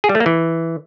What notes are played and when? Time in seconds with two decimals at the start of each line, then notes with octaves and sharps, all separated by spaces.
0.04 G#4
0.09 G3
0.15 A3
0.20 A#3
0.26 E3